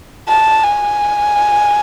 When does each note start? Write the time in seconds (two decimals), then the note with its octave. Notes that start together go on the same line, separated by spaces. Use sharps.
0.28 A5
0.63 G#5